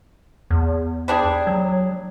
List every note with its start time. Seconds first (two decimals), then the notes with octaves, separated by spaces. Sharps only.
0.51 E2
1.08 G3 D4 G#4
1.47 F#3